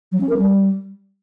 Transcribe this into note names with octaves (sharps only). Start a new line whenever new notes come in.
F#3
C#4
A#4
G3